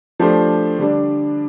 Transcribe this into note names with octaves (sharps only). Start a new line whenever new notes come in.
F3 A3 D4 G4 C5
D3 G3 D4